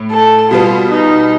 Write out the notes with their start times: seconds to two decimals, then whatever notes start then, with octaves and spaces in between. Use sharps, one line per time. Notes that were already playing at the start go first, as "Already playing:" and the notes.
Already playing: A2
0.11 A4
0.51 B2 G3 B3 F4
0.90 D#4